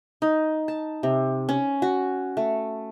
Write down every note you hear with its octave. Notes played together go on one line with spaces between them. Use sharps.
D#4
A5
C3
C#4
F#4
A3